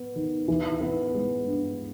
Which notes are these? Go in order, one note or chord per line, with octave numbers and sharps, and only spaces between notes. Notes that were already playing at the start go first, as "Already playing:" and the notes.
Already playing: B3
D#3
E3
B3
G#3
G2